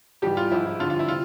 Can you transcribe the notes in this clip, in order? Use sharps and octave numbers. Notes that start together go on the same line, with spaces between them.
G#2 E3 G3 G4
F4
G#2 F3 E4
E4
G2 D3 F3 F4
F4
E4
C3 F4